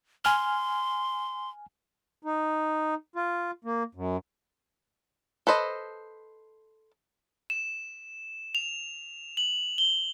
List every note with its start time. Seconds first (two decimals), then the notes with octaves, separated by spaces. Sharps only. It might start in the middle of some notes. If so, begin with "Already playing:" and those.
0.25 G#5 C6 F6
2.23 D#4
3.16 F4
3.64 A#3
3.95 F#2
5.47 A4 B4 C5 D#5
7.50 E7
8.55 F7
9.37 F#7
9.78 G7